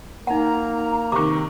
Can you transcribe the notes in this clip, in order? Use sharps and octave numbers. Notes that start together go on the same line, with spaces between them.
A#3 D#4 F#5 A#5
C3 D#3 C#6 D6